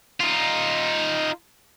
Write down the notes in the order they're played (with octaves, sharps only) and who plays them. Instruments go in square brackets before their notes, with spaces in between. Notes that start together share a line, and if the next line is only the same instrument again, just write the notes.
[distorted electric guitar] D#4 F4